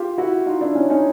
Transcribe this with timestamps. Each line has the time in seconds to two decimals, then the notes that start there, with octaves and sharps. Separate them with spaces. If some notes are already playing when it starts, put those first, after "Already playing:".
Already playing: F4 G4
0.18 E4 F#4
0.46 D#4 F4
0.61 D4 E4
0.75 C#4 D#4
0.90 C#4 D#4